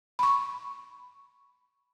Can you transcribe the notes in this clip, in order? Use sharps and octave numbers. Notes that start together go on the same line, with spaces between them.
B5 C#6